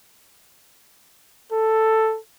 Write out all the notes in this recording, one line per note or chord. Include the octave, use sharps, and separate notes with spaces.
A4